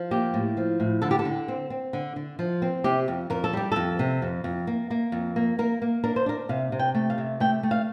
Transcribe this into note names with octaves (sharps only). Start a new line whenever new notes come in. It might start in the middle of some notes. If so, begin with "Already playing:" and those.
Already playing: F3
A#3 G4
A2
F3
A2
D3 A4
G4
A4
D3
C4
C4
D3
D3
F3
C4
C3 G4
F2
F2 A#4
A4
G3 G4
F2 A4
C3
F2
F2
A#3
A#3
F2
A#3
A#3 A#4
A#3
D4 A#4
C5
D4 A#4
C3 F5
C3
G5
A3
F5
C3
A3 G5
A3
F5